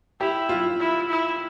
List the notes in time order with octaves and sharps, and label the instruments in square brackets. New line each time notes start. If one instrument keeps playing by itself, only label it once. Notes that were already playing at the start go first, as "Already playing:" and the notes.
[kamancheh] E4 [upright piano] G4
[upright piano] F4
[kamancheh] E4
E4